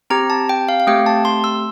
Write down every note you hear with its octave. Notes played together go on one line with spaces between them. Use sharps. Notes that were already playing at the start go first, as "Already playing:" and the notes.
C4 G4 A#5
A5
G5
F5
F5
A3 C4 G4 G5
A5
C6
E6